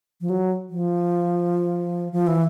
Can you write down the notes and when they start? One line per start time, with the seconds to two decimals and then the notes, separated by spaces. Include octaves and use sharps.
0.21 F3
0.30 F#3
0.70 F3
2.12 F3
2.27 E3